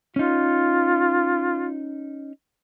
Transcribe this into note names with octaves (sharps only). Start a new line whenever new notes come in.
C#4 D#4 F4